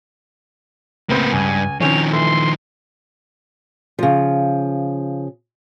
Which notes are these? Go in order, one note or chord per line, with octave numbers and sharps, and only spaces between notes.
C#2 A2 A#3 C4 B4
C#2 G2 G#5
D#3 F3 C4 C#4 C#5 F7
E3 A3 C6
C#3 F3